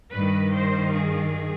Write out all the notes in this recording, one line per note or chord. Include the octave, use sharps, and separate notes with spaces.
G2 D#3 B4
C5
G#4